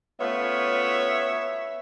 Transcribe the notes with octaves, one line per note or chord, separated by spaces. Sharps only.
A3 B3 C#4 F4 C#5 E5